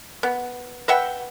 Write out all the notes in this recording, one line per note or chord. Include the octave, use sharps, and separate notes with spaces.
B3
B4 E5 F#5 G5